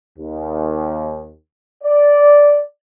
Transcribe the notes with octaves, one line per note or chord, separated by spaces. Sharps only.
D#2
D5